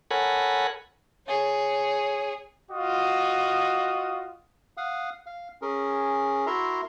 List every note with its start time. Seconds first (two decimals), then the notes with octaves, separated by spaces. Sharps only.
0.11 A4 A#4 C#5 F#5 G#5 B5
1.27 G#4 C#5
2.69 F4 F#4 D#5 D#6
4.77 F5 F#5 D#6
5.26 F5
5.62 C#4 G#4 A#4
6.47 E4 F#4 A#4 E5 A#5 C6